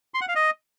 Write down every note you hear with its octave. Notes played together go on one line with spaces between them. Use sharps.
C6
F#5
F5
D#5